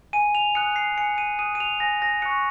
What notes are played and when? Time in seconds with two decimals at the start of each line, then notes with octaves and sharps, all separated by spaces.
0.13 G#5 D#7
0.35 F7
0.55 D#6 F#6 C#7
0.76 C7
0.97 G#5 C#7
1.18 D#7
1.39 D#6 F#6 D#7
1.55 D#7
1.60 F7
1.80 G#5 A#6
2.02 A#6
2.22 C#6 F#6 C#7